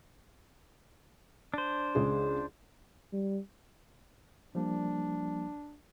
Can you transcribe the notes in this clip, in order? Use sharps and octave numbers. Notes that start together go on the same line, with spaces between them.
D4 C5
C#2 G#4
G3
F3 G3 A#3 D4